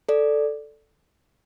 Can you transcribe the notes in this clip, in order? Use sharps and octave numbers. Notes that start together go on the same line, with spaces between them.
A4 D5